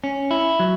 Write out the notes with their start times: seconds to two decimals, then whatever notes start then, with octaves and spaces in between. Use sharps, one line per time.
0.04 C#4
0.31 E4
0.60 F#3